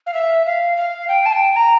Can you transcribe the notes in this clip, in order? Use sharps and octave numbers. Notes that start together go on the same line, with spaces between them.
F5
E5
F5
F5
G5
A5
G5
A#5